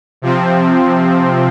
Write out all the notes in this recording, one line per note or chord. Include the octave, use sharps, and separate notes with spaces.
C3 F3 C4